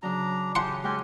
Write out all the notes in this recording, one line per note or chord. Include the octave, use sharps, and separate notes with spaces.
C#3 F#3 D4 A#5
C#3 G4 F#5 G#5 A5 C6
G#3 C#4 F#4 G4 G5 G#5